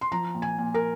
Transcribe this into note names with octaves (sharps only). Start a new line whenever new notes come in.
C6
F3 A#5
A#2
G#5
A#2
A#4